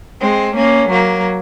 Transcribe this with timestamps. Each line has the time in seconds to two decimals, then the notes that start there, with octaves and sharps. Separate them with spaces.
0.20 G#3 C4
0.55 A#3 C#4
0.90 F#3 A#3